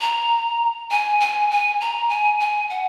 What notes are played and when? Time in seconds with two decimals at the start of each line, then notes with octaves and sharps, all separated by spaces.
0.01 A#5
0.91 G#5
1.20 G#5
1.51 G#5
1.81 A#5
2.10 G#5
2.40 G#5
2.70 F#5